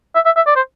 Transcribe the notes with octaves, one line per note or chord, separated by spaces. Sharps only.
E5
E5
E5
D5
C5